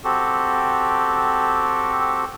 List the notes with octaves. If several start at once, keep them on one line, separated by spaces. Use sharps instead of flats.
C4 F#4 G4 A4